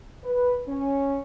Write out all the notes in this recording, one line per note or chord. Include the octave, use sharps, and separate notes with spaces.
B4
C#4